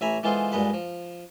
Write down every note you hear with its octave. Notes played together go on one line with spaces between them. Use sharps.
A1 E5 G#5 A#5 B5
E3 G#3 B3 F4 A4 C5
G2 A#2 G#3 B4 F#5
F3